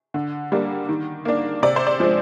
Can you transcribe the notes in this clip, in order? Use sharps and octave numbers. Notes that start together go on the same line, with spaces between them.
D3
G3 A#3 D4
D#3
A#3 D4
C3 D5
C5
D5
F3 G#3 D4